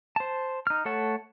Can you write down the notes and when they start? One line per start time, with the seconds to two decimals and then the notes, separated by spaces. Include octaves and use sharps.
0.16 C5 A5
0.67 D#4 F6
0.85 A3 A4 C#5 F#5 A5